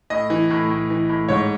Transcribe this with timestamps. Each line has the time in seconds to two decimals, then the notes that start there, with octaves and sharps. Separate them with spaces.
0.10 A2 D#5
0.30 E3
0.50 A2
0.70 A2
0.90 E3
1.09 A2
1.29 G#2 C#5